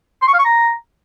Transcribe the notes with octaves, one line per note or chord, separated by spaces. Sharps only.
C6
C#6
F5
C#6
A#5